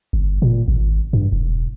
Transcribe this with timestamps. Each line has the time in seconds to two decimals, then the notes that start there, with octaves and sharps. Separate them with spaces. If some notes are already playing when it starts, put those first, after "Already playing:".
0.13 G1
0.42 A#2
0.68 G#1
1.13 G2
1.32 E1